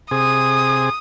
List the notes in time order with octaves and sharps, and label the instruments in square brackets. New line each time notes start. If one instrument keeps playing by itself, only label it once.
[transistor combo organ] C3 G#4 [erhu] D#6